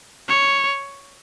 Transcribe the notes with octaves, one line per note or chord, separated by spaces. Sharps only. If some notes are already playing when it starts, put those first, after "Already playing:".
C#5